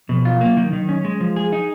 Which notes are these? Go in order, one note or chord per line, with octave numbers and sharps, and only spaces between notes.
B2 F3
F4
F#3 A#3
D#3
D#3
C#4
G#3
F3
G#4
D#4